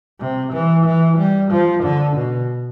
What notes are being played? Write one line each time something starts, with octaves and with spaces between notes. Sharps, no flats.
C3
E3
E3
G3
F3
D3
B2